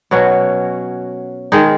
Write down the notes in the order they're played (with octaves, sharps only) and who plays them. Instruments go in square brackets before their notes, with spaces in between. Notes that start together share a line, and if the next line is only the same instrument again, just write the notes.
[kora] B2 F#3 C#4 F#4
D#3 G#3 D#4 G#4